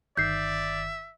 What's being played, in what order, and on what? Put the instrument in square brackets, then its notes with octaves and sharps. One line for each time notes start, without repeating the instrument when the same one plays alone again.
[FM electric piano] G1 D#3 [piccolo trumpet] D5 [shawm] E5 [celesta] G6 C7